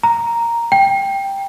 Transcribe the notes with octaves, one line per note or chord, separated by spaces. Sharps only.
A#5
G5